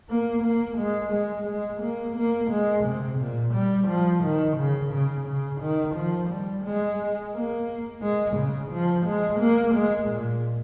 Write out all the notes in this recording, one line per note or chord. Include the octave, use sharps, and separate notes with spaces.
A#3
A#3
G#3
G#3
G#3
A#3
A#3
G#3
C3
A#2
G3
F3
D#3
C#3
C#3
C#3
D#3
F3
G3
G#3
A#3
G#3
C#3
F3
G#3
A#3
G#3
A#2